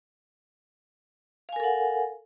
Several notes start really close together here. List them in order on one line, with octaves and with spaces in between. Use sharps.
F5 G#5 A#4 A4 F#5